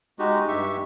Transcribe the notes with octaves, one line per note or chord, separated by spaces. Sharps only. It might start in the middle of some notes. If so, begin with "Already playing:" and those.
G#3 D#4 F#4 G4
G2 G4 E5 C#6